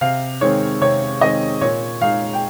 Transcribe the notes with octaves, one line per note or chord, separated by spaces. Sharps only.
C3 F5
D#3 G#3 C4 C#5
C3 C#5
D#3 G#3 C4 D#5
A#2 C#5
G#3 D#4 F5
G5